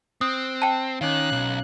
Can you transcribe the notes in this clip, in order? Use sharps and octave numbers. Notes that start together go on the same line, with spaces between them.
C4 D#6 F#6
G5 A5
D#3 C#4 C#5 F5 F#6
B1